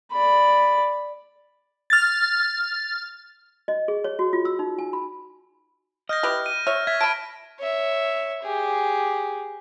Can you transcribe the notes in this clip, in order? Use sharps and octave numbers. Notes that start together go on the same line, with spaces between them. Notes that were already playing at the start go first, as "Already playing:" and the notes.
D5 B5
F6 A6
D#5
G#4
C#5
F#4
F4
E6
D#4
G#5
B5
D#5 F6 G6 A#6
E4 G4 B4
D#7
C#5 E5 F6
E5 G#6 B6
A5 B5 F6 G#6 D7
C#5 E5
G4 G#4